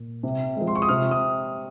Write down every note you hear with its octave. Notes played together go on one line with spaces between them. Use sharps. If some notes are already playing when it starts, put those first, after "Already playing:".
Already playing: A#2
C3
F3 G#3
C6
C#6
D#6
C3 F6
D#6